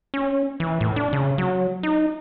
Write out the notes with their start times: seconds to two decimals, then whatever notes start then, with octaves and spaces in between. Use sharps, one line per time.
0.14 C#4
0.60 E3
0.81 A2
0.96 D4
1.13 C#3
1.38 F#3
1.83 D#4